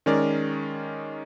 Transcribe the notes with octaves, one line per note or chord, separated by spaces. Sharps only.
D#3 G#3 C#4 A#4 D5